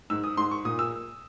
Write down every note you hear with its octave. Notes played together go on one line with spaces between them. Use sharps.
G#2 E6
D#6
G#2 C6
C#6
A#2 D#6
E6